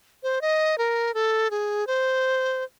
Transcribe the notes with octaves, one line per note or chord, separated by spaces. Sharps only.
C5
D#5
A#4
A4
G#4
C5